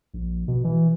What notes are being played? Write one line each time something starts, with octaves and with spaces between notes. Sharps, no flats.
A#1
B2
E3